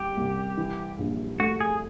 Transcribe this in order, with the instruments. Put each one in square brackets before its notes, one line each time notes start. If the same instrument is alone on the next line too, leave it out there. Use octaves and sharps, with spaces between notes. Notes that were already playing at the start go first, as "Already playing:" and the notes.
Already playing: [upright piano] C2 G3 [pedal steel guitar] G4
[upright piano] C2
E3
A#1
[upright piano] A3 [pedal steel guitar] F#4
[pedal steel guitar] G#4